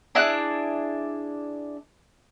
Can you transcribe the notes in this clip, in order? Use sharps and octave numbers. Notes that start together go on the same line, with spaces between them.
D4 E4 G#4 F#6